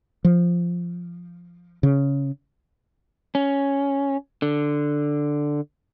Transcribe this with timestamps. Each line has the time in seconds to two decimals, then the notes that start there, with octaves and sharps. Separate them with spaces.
0.24 F3
1.83 C#3
3.35 C#4
4.42 D3